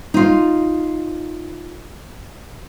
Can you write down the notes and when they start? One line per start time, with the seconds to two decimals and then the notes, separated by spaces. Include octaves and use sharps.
0.14 D#4 F4